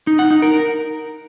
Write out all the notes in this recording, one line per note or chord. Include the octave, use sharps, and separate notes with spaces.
D#4
F#5
D#4
A#4